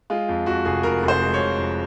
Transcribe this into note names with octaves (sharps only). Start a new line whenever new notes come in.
G#3 F4
F2
F2 F#4
F1 G#4
F1 A#4
F1
C5
G#3
C#5
F1
F2